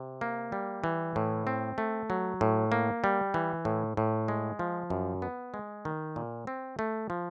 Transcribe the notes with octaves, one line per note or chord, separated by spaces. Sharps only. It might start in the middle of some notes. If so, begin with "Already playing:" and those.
Already playing: C3
A#3
G3
E3
A2
C4
A3
F#3
A2
A#3
G3
E3
A2
A2
G#3
F3
F#2
B3
G#3
D#3
A#2
C4
A3
F3